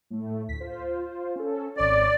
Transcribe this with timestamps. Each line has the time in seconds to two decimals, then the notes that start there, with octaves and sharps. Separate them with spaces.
0.10 A2 A3
0.48 D2 B6
0.60 F4 C5
1.36 C#4 A4
1.77 G#1 C#5 D5